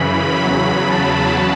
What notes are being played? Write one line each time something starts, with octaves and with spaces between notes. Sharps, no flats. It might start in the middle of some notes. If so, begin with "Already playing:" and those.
Already playing: F#2 C#3 E3 B5
E2 C#3 F#3 B5
A5